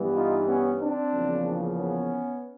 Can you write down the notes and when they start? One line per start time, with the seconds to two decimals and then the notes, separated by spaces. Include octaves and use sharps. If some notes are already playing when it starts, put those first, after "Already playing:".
Already playing: G2 E3 G3 B3
0.14 D#4 F4
0.47 B3 C#4
0.80 C4 D4
1.12 E2 C#3 F3 A#3
1.77 B3 C#4